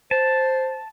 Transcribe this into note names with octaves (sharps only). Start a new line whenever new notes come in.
C5 A5